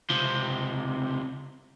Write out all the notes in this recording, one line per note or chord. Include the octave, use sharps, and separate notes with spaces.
C#2 C3